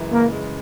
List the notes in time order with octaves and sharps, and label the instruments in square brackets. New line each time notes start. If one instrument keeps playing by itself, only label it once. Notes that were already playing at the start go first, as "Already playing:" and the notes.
Already playing: [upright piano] F#2 C#3 E3 G#3
[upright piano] C#3 [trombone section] A#3
[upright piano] G#3